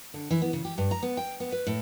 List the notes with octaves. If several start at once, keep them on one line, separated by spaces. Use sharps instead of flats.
D3
E3
B3
C#3
G4
G2
A#5
B3
G5
B3
B4
A2